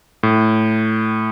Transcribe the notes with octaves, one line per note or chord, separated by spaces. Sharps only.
A2